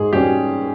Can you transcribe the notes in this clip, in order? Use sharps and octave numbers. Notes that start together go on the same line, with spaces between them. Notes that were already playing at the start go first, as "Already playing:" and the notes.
Already playing: G#2 G#4
G3 C#4 G4